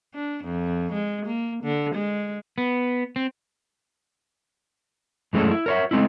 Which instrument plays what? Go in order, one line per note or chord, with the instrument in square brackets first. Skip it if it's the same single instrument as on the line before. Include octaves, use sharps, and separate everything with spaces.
[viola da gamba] D4
F2
G#3
A#3
D3
G#3
[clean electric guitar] B3
C4
[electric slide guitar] F#2 E3 G#3 A3 C#4
E4
A#4 C#5 E5
G#3 A3 C4 D#4 E4